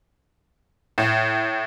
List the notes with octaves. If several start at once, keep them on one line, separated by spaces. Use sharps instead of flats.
A2